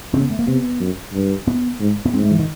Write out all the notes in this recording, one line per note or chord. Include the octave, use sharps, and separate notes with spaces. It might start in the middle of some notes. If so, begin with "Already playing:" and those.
C#3 C4
B3
A3
A#3
C3 B3
F#2
G2
B3
G#2
B3
G#2 C4
A3
E3
D#3